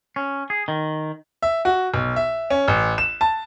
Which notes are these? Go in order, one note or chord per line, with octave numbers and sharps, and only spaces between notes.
C#4
G#4
D#3
E5
F#4
B1
E5
C#4
A1
E7
A5